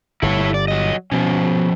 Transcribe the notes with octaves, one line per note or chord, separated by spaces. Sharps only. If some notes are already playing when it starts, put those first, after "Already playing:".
G1 E4 A4 C#5
D5
F#3 D#5
B2 F3 C#4